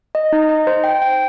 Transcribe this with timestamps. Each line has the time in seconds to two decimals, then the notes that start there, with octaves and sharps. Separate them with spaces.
0.15 D#5
0.33 D#4
0.49 D#5
0.67 C5
0.84 G5
1.02 G5